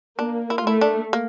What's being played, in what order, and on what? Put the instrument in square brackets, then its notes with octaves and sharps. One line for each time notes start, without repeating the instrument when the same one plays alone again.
[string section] A#3 [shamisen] D4
[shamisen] E4
F4
[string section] A3 [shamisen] E4
[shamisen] D4
A#3